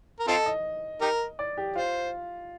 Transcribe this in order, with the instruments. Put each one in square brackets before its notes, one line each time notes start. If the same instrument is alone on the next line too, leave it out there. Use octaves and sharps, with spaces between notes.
[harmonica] A#4
[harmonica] C4 F4 A4 [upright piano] D#5
[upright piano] D#5
[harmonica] D#4 G4 A#4
[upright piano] D5
G4
[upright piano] F4 [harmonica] C5